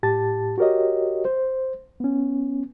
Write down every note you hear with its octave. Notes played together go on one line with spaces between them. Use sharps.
A2 G4 A5 A6
F#4 G4 A#4 C#5 D#5
C5
B3 C#4